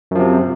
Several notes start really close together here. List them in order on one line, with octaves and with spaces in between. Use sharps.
F#2 F3 C3